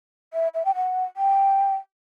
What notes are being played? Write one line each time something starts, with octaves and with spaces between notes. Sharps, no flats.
E5
E5
G5
F#5
G5